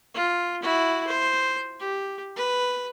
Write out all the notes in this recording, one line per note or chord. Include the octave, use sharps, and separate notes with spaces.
F4
E4 F#4
C5
G4
B4